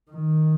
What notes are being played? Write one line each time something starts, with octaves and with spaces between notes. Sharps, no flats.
D#3